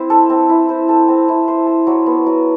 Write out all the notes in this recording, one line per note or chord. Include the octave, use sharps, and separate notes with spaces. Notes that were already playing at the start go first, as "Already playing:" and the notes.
Already playing: C4 E4 C5
A4
C4
E4
C5
A4
C4
E4
C5
A4
F#3
B3
F#3